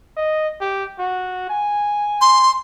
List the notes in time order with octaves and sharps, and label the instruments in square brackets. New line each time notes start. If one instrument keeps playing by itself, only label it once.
[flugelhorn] D#5
G4
F#4
G#5
[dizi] C6